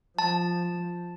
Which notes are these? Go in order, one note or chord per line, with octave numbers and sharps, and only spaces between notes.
F3 A5